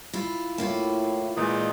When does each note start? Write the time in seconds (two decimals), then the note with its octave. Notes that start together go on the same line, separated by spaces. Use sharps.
0.13 E4 F4
0.58 A2 A#3 E4 F4
1.37 A#2 E3 G#3 D#4